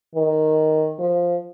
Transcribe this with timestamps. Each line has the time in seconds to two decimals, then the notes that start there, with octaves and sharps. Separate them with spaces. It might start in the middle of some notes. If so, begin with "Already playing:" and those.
0.16 D#3
0.99 F3